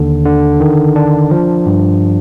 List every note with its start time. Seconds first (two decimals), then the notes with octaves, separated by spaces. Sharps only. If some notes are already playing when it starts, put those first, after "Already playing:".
Already playing: D#2 D3
0.25 D3
0.60 D#3
0.96 D4
1.31 F3
1.66 G2